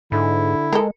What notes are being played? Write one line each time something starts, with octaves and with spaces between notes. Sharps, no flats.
G#2 D3 E4
G#3 A4 A#4